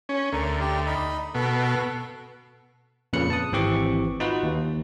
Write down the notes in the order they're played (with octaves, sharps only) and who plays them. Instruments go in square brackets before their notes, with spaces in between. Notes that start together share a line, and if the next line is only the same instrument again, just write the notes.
[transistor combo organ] C#4
[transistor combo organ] D2 [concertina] A#4
[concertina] G4
D#4 D#5 B5
[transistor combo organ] B2 [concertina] A4
[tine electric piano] F2 A#2 C#3 B4 F#6 C#7
A5 D#6
G#1 E3 C4 G4 C#6 D6
D#4 F4 F#4 B4
D#2